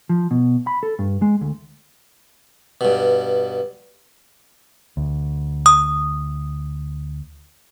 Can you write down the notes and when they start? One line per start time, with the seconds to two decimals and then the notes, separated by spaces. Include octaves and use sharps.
0.09 F3
0.31 B2
0.67 B5
0.83 A4
0.99 G2
1.22 G#3
1.41 D2
2.81 G2 B2
4.97 D2
5.66 D#6